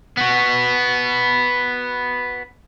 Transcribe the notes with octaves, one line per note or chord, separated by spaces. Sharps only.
B3 F#4